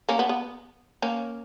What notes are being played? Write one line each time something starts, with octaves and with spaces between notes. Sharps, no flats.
A#3 C#4
B3
B3
A#3 C#4